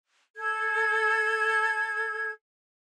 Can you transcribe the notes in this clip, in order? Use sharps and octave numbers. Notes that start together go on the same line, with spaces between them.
A4 G#6